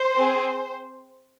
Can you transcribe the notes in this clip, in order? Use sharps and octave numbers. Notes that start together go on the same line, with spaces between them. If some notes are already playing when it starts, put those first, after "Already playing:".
Already playing: C5
C4 G#4